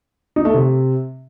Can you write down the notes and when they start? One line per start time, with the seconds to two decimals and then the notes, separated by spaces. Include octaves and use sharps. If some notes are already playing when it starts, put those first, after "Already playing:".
0.36 D#4
0.45 A3
0.54 C3